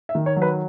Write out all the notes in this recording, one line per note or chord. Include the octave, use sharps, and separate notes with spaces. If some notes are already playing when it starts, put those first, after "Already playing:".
E5
D#3
C#5
F#3
B4